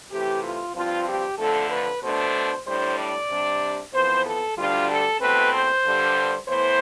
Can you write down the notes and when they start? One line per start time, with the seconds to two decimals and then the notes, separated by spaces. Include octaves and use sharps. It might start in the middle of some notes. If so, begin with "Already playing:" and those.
0.11 C3 E3 A3 G4
0.43 F4
0.74 G2 F3 C4 F4
1.06 G4
1.38 F2 D3 A3 D4 A4
1.70 B4
2.02 B2 A3 D4 C5
2.65 A2 G3 D4 C5
2.97 D5
3.30 C3 G3 D4
3.93 F2 E3 B3 C5
4.25 A4
4.57 D2 D3 G3 D4 F4
4.89 A4
5.20 E2 B2 A3 C4 B4
5.52 C5
5.84 G2 D3 G3
6.48 A2 E3 B3 C5